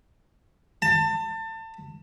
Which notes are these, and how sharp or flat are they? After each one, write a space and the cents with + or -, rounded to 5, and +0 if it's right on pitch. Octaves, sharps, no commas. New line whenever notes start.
A5 +30